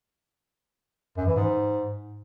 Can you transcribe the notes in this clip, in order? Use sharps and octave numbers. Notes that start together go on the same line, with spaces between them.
F#2
E3
G#2